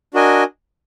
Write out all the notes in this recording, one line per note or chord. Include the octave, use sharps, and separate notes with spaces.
D4 F#4 A#4 D#5 G#5